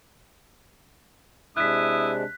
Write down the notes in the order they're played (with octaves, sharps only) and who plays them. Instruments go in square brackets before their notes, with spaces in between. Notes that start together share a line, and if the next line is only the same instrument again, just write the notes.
[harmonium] C3 G#3 D4 [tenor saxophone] E4 [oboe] D#6 [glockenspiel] F#6 B6